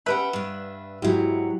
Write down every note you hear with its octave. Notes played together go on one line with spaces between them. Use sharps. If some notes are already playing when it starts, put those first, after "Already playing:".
C#4 G4 B4 E5 F#5
G2 D4
G#2 F#3 E4 F#4 G4